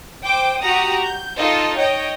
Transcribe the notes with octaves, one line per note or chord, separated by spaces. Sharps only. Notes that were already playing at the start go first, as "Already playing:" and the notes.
C5 G5 D6
F#4 G4 F#5 A#5 D#6
G6
D#4 F4 A4 D#5
C#5 D#5 G5